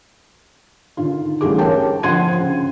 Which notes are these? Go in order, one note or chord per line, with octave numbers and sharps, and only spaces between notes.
D3 D#3 F4
A1 G3 A3 G4 G#4 D6
A#4 C#5 G5 A5
D3 F3 F#5 C6 G#6 D#7
C#3